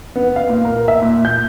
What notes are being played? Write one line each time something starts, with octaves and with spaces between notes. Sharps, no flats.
B3
F5
A#2
A#4
E5
A#2
G6